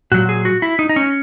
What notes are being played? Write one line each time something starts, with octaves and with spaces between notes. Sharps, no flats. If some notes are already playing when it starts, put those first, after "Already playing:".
A#2 F#3 F#4
G#4
F#4
E4
D#4
D#4
C#4